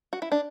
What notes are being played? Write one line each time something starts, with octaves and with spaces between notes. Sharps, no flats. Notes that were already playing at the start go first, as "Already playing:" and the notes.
F#4
E4
D4